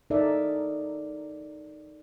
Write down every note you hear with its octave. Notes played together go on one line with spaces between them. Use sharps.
D#4 A4 A#4 D5 E5